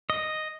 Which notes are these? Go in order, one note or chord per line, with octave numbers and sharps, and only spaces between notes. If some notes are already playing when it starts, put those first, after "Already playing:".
D#5